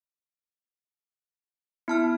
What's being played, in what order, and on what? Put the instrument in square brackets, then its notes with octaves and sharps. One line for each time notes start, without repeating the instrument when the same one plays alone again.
[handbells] B3 A5 F6 [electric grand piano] E4